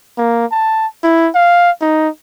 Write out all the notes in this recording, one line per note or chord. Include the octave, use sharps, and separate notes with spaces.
A#3
A5
E4
F5
D#4